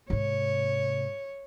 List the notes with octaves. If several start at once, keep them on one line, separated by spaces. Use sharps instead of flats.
G#2 C3 C#5